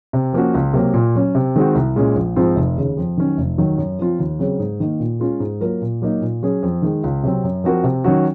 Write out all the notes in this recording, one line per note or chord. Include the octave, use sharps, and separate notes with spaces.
C3
F3 A#3 C#4 F#4
C#2
C3 F#3 A#3
A#2
F#3 C#4
C3
D#3 G#3 C4 F#4
C2
A#2 G#3 C#4
A#1
G#2 F3 C4 F4
F1
D#2 C#3
F2
D#3 F#3 C#4
F1
D#2 D#3 F#3
F#2
F3 C4 F4
D#2
C#3 F#3 C4
G#2
D#3 A#3 D#4
A#2
G#3 C#4 F4 G#4
G#2
F#3 A#3 F4 A#4
A#2
F#3 A#3 D#4
A#2
F#3 C#4 G#4
F2
D#3 G#3
C#2
C3 F#3 C4
F#2
F3 C4 F#4 A#4
C3
D#3 F#3 C#4 F#4